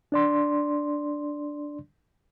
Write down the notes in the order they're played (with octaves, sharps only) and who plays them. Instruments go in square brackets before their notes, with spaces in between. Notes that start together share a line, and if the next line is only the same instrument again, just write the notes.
[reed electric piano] D4 D5 C6